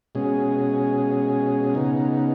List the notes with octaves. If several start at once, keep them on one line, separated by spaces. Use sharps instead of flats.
B2 G#3 C#4 G#4
C#3 B3 D#4